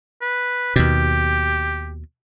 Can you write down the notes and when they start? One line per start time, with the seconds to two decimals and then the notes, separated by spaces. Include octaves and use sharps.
0.22 B4
0.76 D#2 B2 G4